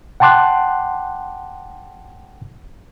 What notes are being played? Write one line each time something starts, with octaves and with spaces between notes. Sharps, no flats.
F#5 G5 A5 C6 D6 F#6